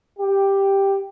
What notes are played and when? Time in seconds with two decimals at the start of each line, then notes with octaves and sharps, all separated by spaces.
0.19 G4